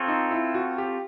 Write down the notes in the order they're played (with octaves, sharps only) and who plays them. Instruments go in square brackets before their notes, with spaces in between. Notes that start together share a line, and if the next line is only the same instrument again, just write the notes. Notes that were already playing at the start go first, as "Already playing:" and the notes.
Already playing: [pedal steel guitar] C4 F4 A4 C#5
[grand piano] D#4
E4
F#4
G4